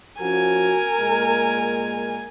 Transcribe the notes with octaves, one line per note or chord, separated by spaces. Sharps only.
F3 C#4 F#4 A#4 G#5
A#2 G#3 A#3